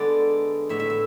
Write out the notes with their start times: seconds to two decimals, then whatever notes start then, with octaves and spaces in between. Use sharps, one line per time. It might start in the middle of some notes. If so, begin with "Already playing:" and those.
Already playing: D3 G#3 B3 D5
0.69 A2 E3 B3 E5
0.80 E5
0.90 E5